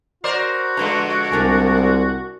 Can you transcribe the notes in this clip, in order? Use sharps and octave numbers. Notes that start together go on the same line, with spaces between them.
F#4 A#4 C5 D5
D3 F3 G#3 B4 A#5
C2 D4 A#4 G#5